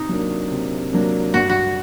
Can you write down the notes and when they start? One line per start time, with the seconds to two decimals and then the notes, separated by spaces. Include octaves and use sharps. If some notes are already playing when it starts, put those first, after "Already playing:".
Already playing: C3 D#4
0.09 F#3 A#3 D4
0.52 C3
0.93 F#3 A#3 D4
1.34 G2 F#4
1.49 F#4